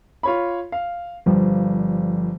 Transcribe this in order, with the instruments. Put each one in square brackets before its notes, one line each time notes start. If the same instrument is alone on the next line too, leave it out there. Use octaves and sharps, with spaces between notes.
[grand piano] F4 C#5 B5
F5
[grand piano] G1 [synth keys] F3 G3